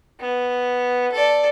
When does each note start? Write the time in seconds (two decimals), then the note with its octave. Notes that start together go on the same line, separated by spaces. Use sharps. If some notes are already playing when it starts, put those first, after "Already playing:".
0.21 B3
1.12 A4 D5